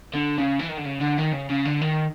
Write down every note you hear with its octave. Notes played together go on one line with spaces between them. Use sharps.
D3
C#3
E3
D#3
D3
C#3
D3
D#3
C#3
C#3
D3
D#3